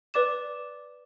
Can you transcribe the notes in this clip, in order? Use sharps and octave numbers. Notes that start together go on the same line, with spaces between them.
B4 D5 D6 E7